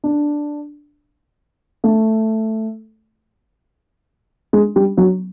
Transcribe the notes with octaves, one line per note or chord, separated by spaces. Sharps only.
D4
A3
G#3
G3
F#3